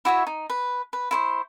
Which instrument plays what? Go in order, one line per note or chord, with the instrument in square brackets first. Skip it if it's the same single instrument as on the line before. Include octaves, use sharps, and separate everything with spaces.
[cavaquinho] E4 F#4 C#5 E5
D#4
B4
B4
E4 C5 C#6